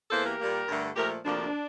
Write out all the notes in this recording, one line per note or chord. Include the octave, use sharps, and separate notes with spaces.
E2 E3 A#3 A4 C5
G4 A#4
A#2 G3 A#3
G2 D3 A3
A#2 F3 A3 G4 A#4
D2 C3 F3 A#3 D4